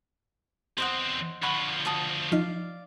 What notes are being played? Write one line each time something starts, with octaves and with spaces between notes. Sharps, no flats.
E2 C4 C5 D#5 F#5
D2 F3 F#5 B5 C#6
F#4 A5 D#6
F3 D#4 D5 F5